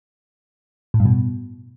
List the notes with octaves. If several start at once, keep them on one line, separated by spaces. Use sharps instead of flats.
A2
G2
B2